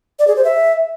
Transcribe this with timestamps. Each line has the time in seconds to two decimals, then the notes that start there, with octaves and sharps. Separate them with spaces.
0.19 D5
0.27 G#4
0.36 C5
0.44 E5